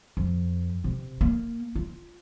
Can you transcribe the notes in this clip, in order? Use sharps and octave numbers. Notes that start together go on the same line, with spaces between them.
F2
C3
A#3
F4